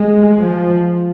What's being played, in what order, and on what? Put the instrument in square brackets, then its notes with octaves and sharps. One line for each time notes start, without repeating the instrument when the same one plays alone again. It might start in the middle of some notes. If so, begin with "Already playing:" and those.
Already playing: [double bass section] G#3
F3